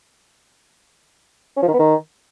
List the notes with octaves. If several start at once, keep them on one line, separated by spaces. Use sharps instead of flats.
C#4
F3
D#3
B3
D#3